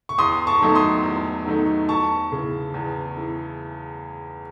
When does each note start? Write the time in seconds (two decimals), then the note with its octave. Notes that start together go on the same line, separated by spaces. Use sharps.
0.09 C#6
0.18 E2 C6 D#6
0.47 A5 C#6
0.61 D#3 F#3 A3 D#4
0.75 C6 D#6
1.03 E2
1.46 D#3 F#3 A3 D#4
1.89 E2 A5 C#6
2.32 C#3 E3
2.74 E2
3.17 E3